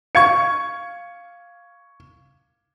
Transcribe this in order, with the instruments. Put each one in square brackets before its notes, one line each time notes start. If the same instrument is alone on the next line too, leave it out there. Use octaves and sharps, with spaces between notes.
[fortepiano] F5 [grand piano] C#6 G#6 C#7